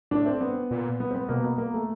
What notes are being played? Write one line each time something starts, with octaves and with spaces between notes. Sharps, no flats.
A2 D4
C4
B3
A#2
B3
C4
B3
B2 A#3
B3
A#3
A3